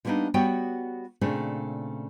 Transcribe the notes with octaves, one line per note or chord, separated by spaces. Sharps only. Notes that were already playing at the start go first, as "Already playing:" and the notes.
D3 G3 A#3 B3 D4 D#4
G3 B3 F#4 C#5 G5
A#2 C#3 A3 C4 D4